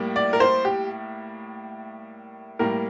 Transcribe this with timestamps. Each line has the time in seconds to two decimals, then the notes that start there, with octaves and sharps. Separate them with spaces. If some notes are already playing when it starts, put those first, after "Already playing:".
Already playing: A2 G3 A#3
0.16 D5
0.33 A#4
0.40 C5
0.65 G4
2.59 A2 G3 A#3 A#4